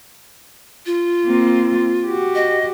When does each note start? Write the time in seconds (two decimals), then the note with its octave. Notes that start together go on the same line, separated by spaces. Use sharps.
0.86 F4
1.25 A#3 C4
2.06 F#4 G4
2.35 D#5